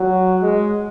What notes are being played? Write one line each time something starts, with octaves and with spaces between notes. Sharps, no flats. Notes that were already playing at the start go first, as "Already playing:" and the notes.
Already playing: F#3
G#3